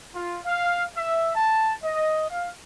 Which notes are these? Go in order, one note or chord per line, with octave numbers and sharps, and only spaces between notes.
F4
F5
E5
A5
D#5
F5